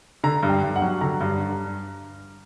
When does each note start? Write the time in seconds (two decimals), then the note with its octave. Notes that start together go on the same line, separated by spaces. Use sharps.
0.24 D3 A#5
0.43 G2
0.49 G5
0.63 G2
0.76 F#5
0.82 F#3
1.01 D3 A#5
1.21 G2
1.40 G2